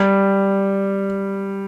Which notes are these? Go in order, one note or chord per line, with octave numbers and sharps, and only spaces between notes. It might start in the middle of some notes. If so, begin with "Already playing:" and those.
Already playing: G3